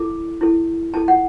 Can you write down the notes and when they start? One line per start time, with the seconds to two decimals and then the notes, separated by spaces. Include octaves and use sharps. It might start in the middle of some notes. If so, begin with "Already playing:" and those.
Already playing: E4 A4 D6
0.41 E4 A4
0.94 E4 A4 A5
1.08 F#5